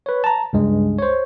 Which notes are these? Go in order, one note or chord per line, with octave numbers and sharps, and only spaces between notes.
B4 C#5
A5 A#5
C#2 G2 G#3
C5 C#5